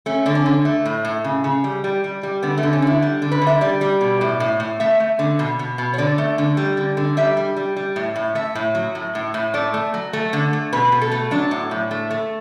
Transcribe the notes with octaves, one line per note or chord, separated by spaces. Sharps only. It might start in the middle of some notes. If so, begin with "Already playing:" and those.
A3 C#4
D3 D4
C#4
D3
A3
A2
A2
C#3
C#3
G3
G3
G3
G3
D3 B3
A3
D3
C#4
D3 E4
G3
D3
B4
D3
E5
G3 D5
G3
B2
A2
A2
A2
A3 E5
A3
D3
B2
B2
B2
C#5
D3 D5
A3
D3
G3
D3
D3
G3 E5
G3
G3
G3
A2
A2
A3 E5
A2
F#3
A2
A2
A2
A3 D5
A3
F#3
A3
D3
A3
B2 B4
B2
A4
A3
F#3 D4
A2
A2
A3
A3